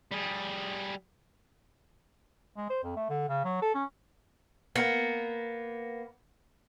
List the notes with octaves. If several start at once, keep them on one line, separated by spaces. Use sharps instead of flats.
G3 G#4
G#3
C5
F2
A3
D3
C#3
F#3
A4
C#4
A#3 B3